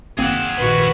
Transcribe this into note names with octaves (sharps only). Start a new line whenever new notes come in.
G#1 A#3 C4 G#4 F#5
A#1 G#2 D#3 F#4 B4